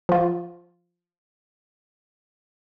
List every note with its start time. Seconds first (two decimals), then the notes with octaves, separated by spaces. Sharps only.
0.09 F3 F4